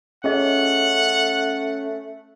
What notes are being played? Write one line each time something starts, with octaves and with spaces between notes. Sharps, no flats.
A3 C#4 F4 G#4 D#5 F#5